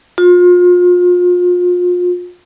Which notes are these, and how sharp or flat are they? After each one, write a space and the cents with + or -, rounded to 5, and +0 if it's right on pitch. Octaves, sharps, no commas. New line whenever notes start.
F4 +35